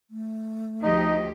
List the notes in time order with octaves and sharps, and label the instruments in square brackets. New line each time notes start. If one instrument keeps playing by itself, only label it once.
[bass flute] A3
[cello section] D2 F3 G4 [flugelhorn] D#4 [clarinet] D#5